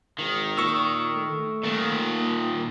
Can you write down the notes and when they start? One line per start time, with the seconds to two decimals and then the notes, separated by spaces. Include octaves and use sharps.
0.18 G#1 D#3
0.57 A#2 C#6 E6
1.16 A3
1.64 A#2 D#3
2.17 A#3